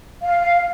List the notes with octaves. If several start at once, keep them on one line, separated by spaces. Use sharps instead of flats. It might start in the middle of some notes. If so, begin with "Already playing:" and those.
F5